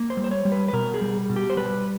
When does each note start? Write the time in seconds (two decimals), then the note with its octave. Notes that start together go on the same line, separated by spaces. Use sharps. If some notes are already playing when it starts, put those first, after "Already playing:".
Already playing: A#3
0.10 C5
0.17 G3
0.24 C5
0.31 C#5
0.45 G3
0.52 B4
0.68 B4
0.73 B2 A#4
0.94 G#4
1.01 G3
1.29 B2
1.36 G4
1.50 C5
1.57 G3 B4